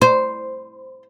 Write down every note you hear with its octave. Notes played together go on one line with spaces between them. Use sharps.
C5